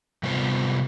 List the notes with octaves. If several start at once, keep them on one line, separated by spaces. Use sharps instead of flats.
C3 G3 B3 F4 C5